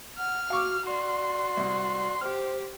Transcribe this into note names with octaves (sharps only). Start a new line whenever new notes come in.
F#5 F6
F#4 F5 C#6 D6
F#4 D5 C6
C2
G4 C5 F6